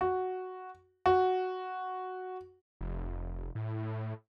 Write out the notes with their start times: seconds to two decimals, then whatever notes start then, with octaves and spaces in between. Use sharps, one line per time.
0.01 F#4
1.06 F#4
2.81 F1
3.55 A2